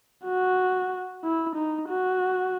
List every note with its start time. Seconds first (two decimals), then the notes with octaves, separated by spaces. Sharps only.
0.25 F#4
1.24 E4
1.56 D#4
1.89 F#4